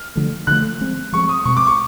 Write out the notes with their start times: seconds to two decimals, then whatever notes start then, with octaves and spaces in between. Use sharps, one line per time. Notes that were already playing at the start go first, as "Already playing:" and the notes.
Already playing: F6
0.16 D3 F3 A3
0.47 D3 F3 A3 F#6
0.80 F3 G#3 C4
1.13 F3 G#3 C4 C#6
1.29 D#6
1.45 B2 G#3 C4 C#6
1.57 D6
1.67 C#6